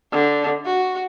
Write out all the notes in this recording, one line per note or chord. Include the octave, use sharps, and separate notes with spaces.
D3
F#4